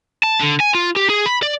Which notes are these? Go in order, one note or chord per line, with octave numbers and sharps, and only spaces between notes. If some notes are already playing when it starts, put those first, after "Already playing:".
A5
D3
G#5
F4
G4
G#4
B5
D5